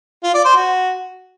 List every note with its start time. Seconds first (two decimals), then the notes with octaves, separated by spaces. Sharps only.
0.23 F4
0.34 D5
0.45 C5
0.56 F#4